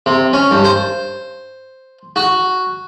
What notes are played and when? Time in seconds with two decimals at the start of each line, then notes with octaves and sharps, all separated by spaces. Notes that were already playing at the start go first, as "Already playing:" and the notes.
0.06 C3
0.33 C#4
0.51 G2
0.64 C5
2.16 F#4